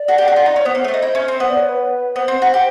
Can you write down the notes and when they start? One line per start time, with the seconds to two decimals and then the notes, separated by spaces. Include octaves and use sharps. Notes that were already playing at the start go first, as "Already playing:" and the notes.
Already playing: D5
0.08 F#4
0.18 G4
0.28 F#4
0.36 F4
0.46 D#4
0.56 C#4
0.59 C#5
0.65 B3 C5
0.75 A#3
0.84 A3
0.88 D4
0.94 D#4
1.02 E4
1.15 C#4
1.28 C4
1.40 B3 C5
1.50 D5
1.60 C#5
1.69 B4
2.16 B3 C5
2.28 C4
2.42 F#4
2.54 G4